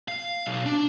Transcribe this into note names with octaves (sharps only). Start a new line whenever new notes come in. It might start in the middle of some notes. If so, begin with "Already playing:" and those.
F5
B1
D4